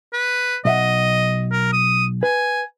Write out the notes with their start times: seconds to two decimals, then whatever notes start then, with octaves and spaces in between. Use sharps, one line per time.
0.13 B4
0.65 B1 D#5 E5 F#5
1.52 A#4
1.73 D#6
2.23 B4 G#5